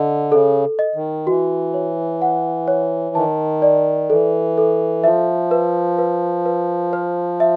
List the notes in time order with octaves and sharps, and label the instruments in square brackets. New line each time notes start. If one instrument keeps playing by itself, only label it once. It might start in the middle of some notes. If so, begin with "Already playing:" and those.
Already playing: [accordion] D3 [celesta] D#5
[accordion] C#3 [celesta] A4
[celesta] D#5
[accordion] D#3
[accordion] E3 [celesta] F#4
[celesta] C#5
F#5
C#5
[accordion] D#3 [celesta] A5
[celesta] D5
[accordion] E3 [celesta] A4
[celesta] A4
[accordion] F3 [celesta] E5
[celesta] B4
B4
B4
C5
E5